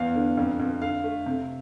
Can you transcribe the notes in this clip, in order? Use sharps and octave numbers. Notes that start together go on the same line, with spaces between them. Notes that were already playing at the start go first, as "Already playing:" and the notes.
Already playing: E2 F5
D3
F2
F2
D3 F5
A3
C3